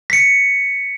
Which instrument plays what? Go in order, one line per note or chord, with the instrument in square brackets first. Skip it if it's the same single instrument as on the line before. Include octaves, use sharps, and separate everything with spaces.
[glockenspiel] B6 C#7